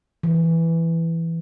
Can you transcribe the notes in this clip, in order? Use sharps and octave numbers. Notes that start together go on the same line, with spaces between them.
E3